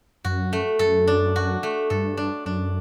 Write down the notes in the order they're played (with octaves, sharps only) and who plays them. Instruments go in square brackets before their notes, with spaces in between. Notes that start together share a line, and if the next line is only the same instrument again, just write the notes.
[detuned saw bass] F#2 [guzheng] F#4
[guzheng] A3
[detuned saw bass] F#2 [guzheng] A4
[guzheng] D4
F#4
A3
[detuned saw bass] G2 [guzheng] A4
[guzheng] D4
[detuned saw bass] F#2 [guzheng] D4